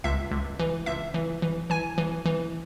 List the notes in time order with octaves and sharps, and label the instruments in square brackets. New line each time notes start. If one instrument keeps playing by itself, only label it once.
[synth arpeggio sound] C#2 E5
C#2
E3
C#2 E5
E3
E3
E3 G#5
E3
E3